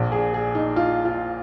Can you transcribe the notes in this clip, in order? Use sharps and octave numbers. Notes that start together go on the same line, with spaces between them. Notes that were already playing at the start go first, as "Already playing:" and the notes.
Already playing: A#1 A#2
G#4
G#4
D#4
F4
F4